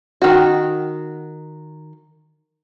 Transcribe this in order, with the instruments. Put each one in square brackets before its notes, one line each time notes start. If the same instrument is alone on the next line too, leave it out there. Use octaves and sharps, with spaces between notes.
[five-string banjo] D#3 F#4